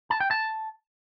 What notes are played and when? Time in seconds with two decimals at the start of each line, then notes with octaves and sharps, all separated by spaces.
0.10 A5
0.20 G5
0.31 A5